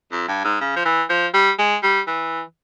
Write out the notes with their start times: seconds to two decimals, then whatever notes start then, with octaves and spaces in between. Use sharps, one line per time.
0.12 F2
0.28 G2
0.44 G#2
0.61 C#3
0.76 F3
0.85 E3
1.10 F3
1.34 G3
1.59 G#3
1.83 G3
2.07 E3